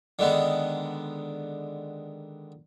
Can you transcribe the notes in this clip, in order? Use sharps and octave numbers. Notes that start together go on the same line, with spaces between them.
D3 D#3 G#3 B3